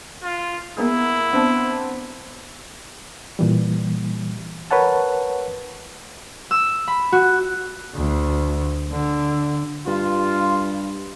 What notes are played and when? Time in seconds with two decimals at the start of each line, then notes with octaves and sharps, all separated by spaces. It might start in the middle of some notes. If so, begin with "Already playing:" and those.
0.23 F4
0.77 A#3 B3 E4 G#4
1.33 B3 C4 D4
3.39 A#2 E3 G3
4.71 A#4 B4 C#5 F#5 A5
6.51 E6
6.88 B5
7.13 F#4
7.94 D2
8.91 D3
9.87 G2 F4